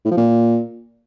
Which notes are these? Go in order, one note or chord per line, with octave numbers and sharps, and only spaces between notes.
A2
F3
A#2